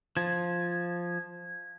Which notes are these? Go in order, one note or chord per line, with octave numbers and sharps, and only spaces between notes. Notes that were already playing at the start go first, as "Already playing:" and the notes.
F3 G#6